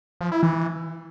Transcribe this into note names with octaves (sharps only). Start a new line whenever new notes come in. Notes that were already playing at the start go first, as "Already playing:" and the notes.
F3
E4
E3